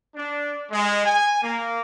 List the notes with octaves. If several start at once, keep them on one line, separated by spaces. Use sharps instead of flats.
D4
G#3
G#5
A#3